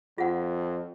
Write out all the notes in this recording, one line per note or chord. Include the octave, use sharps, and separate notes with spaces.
F2 F4 F#5